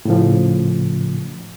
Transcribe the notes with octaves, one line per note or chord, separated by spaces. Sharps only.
A2 C#3 F3